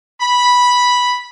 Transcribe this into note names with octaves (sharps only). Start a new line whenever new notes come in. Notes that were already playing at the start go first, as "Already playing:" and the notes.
B5